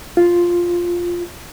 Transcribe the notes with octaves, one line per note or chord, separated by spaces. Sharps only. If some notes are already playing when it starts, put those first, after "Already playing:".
F4